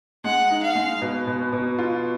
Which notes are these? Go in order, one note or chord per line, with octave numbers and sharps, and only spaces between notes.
G#3 F#5
D#4
F5
G#3
B2
B2
B2
F4